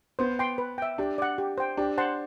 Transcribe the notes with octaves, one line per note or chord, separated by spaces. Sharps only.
B3 C5
G5 C6
B4
E5 G5
D4 G4
D5 F#5
G4
C5 G5
D4 G4
C5 F#5 A5 C6